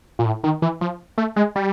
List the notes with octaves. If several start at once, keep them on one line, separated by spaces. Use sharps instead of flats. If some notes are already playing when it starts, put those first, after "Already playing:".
A#2
A2
D#3
E3
F3
A3
G#3
G3